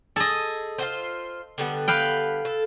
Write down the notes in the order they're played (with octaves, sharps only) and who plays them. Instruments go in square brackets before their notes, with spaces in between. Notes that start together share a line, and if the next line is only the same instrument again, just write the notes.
[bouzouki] G#4 [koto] A4 D#5
[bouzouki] F4 F#4 C5
D3 G3 B3
[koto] B4 F5 G5
[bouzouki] A4